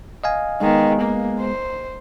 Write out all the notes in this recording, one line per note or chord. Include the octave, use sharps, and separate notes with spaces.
D#5 F5 G#5
D#3 G#3 B3
A#3
C5